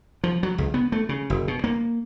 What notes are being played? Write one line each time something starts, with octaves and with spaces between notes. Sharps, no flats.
F3
F#3
C#2
B3
A3
C#3
F#1
B2
A#3